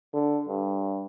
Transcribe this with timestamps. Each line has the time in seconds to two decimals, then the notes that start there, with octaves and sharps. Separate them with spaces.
0.13 D3
0.48 G2